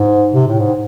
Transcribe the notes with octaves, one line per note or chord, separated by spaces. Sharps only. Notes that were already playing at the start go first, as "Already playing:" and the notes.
Already playing: G#2
C3
A2
G#2